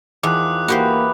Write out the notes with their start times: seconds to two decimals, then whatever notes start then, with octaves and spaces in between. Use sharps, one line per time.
0.23 E2 D#3 F3 D6 D#6 F#6
0.68 E3 A#3 F#4 G4 C5 A#5 B5